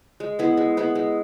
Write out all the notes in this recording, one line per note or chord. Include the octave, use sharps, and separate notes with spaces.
G#3
B3 E4 G#4
G#3
B3 E4 G#4
G#3